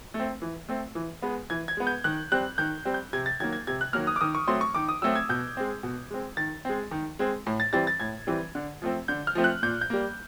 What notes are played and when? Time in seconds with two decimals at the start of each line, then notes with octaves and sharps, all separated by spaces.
0.14 A3
0.20 C4
0.42 E3
0.69 A3 C4
0.95 E3
1.22 G#3 B3
1.50 E3 G#6
1.68 G#6
1.77 G#3 B3
1.87 G6
2.04 D#3 F#6
2.32 G3 C4 F#6
2.58 D#3 G6
2.85 G3 C4
2.94 G6
3.13 C3 G#6
3.26 A6
3.40 D#3 F#3 A#3 G#6
3.53 G#6
3.67 C3 G#6
3.81 F#6
3.93 D#3 F#3 A#3 F6
4.07 D#6
4.16 D6
4.21 D#3 D#6
4.35 C#6
4.47 F#3 A3 C4 C6
4.61 C#6
4.74 D#3 D6
4.89 D#6
5.02 F#3 A3 C4 E6
5.16 G#6
5.29 B2 G6
5.57 G#3 C4
5.83 B2
6.11 G#3 C4
6.37 D#3 A6
6.65 G#3 C4
6.91 D#3
7.19 G#3 C4
7.47 A2
7.60 A6
7.73 E3 G3 C4 A6
7.87 A6
8.00 A2 G#6
8.27 E3 G3 C4
8.55 D3
8.82 F3 A3 C4
9.08 D3 G6
9.27 F6
9.35 F3 A3 C4
9.44 F#6
9.63 A#2 G6
9.81 G6
9.90 G3 A#3